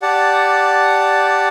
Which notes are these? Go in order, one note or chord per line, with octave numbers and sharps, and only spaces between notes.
G4 D5 F#5 A5